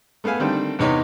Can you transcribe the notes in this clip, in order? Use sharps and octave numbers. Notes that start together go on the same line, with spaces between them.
A3 B3 A4 F5 G#5
D3 D#3 G3 A3 C4
E2 C3 B3 D#4 C#5